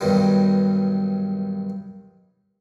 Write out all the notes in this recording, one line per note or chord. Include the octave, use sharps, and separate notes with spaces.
B1 G2 D#3 F#3 G3